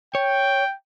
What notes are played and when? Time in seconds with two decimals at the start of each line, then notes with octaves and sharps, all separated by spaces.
0.15 C#5 G5